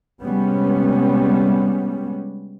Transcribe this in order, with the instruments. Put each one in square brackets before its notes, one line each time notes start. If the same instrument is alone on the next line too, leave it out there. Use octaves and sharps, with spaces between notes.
[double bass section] C3 G3 G#3 B3 C#4